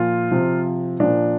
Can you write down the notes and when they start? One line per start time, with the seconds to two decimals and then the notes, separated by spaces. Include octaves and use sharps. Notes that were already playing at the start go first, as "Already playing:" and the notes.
Already playing: A#2 F3 F4
0.31 C3 F3
1.00 A#2 F3 D4